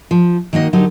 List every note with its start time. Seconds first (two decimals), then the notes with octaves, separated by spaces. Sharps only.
0.11 F3
0.53 D#3 A#3 F#4 D#5
0.73 D3 F#3 D#4 G4 A#4